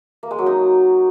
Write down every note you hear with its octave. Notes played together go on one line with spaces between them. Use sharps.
A#3
G#3
F#3
D#4